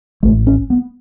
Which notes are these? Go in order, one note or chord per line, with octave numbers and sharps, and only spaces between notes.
A1 A2 A3
C#4
B3